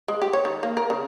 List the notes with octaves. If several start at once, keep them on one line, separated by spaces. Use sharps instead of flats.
G#3
G4
C#5
D#3
A#3
A#4
C#3